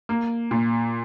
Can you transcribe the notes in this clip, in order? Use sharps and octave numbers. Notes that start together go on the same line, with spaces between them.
A#3
A#2